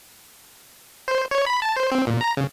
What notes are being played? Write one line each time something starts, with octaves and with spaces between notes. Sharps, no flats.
C5
C#5
B5
A5
C5
C4
A#2
A#5
C#3